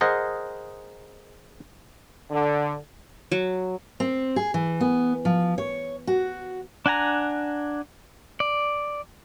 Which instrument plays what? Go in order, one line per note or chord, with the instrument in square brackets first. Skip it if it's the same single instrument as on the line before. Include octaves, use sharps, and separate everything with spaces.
[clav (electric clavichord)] G#4 A#4 C5 D#5 F#5
[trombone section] D3
[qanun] F#3
[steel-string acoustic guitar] C4
G#4
E3
B3
F3
C#5
F#4
[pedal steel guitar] D4 F#5 G#5 A#5
D5